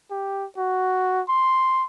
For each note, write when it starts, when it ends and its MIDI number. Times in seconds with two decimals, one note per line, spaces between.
0.11 0.46 67
0.58 1.22 66
1.29 1.85 84